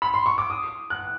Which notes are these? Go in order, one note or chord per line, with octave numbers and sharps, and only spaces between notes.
B5
C6
C#6
D6
D#6
F#6